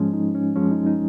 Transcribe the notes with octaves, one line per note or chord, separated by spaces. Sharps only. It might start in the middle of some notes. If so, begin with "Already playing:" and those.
Already playing: G#2 F3 G#3 C#4
D#4
C#4
F#2 F3 G#3 C#4
D#4
D#4